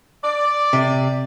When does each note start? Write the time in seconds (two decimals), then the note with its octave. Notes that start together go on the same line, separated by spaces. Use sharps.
0.24 D5
0.73 C3